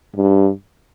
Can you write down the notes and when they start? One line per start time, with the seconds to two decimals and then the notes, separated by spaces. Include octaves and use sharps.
0.16 G2